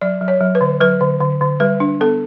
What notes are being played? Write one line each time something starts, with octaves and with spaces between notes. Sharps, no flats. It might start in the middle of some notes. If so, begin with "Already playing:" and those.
F#3 D5
F#3
C#5
F#3
B4
D3
F#3 B4
D3
D3
D3
G3 B4
D4
B3 A4